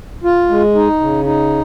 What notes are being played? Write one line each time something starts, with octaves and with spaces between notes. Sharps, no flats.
F4
G#3
D#4
C#3
D#4